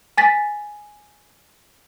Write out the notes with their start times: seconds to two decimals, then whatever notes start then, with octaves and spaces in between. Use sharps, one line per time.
0.18 G#5 A6 B6